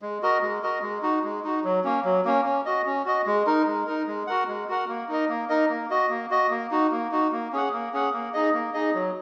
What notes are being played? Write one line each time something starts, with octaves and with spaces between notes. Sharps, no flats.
G#3
F#4 A#4 D#5
G#3
F#4 A#4 D#5
G#3
D#4 F#4
G#3
D#4 F#4
F#3
A#3 C#4
F#3
A#3 C#4
C#4
F#4 D#5
C#4
F#4 D#5
G#3
D#4 A#4
G#3
D#4 A#4
G#3
F#4 A#4 F#5
G#3
F#4 A#4 F#5
A#3
D#4 A#4 D#5
A#3
D#4 A#4 D#5
A#3
F#4 D#5
A#3
F#4 D#5
A#3
D#4 F#4
A#3
D#4 F#4
A#3
C#4 G#4 F#5
A#3
C#4 G#4 F#5
A#3
D#4 G#4 D#5
A#3
D#4 G#4 D#5
F#3